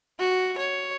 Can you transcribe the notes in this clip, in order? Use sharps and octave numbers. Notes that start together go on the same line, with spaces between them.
F#4
C#5